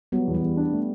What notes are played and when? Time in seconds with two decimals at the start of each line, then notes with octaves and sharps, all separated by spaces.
0.12 F#3 G3 B3
0.27 E2
0.34 G3
0.42 E2
0.57 D4
0.73 A3